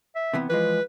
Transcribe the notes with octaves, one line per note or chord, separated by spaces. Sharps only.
E5
C3 E3 B3
E3 F3 G#3 B4